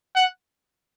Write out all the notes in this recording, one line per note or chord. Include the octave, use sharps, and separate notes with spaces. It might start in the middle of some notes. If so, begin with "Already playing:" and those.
F#5